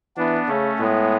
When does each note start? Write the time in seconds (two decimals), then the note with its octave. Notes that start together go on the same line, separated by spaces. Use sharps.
0.17 E3 B3 D4
0.48 C#3 A3 C#4
0.79 A2 G#3 B3